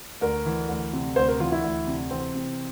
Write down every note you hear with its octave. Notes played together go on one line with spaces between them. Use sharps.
D2 A#4
E3
D2
C3
D2 C5
A#4
E3 F4
E4
D2
C3
E3 C4
C3